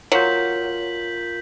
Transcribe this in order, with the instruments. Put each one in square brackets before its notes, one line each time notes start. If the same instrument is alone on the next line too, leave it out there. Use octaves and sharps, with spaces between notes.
[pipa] F#3 [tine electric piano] F4 A#4 [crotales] G6 B6 F#7